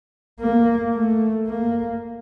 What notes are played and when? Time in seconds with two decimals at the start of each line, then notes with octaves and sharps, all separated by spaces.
0.40 A#3
0.94 A3
1.47 A#3